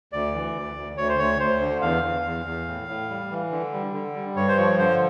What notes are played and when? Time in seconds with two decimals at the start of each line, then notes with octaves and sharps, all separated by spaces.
0.12 D2 D5
0.34 E3
0.55 D2
0.76 D2
0.97 D2 C#5
1.09 C5
1.19 D2 C#5
1.39 D2 C5
1.60 D3
1.82 E2 F5
2.03 E2
2.25 E2
2.46 E2
2.67 A2
2.89 A2
3.10 G3
3.30 E3
3.51 D3
3.72 G3
3.94 D3
4.15 G3
4.36 G2 C#5
4.48 C5
4.57 F3 C#5
4.79 D3 C5